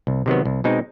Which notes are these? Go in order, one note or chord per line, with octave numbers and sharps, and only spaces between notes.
C2
C3 D#3 F#3 B3
C2
B2 G#3 C4 D#4